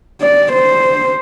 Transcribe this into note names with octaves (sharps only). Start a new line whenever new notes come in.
D5
C5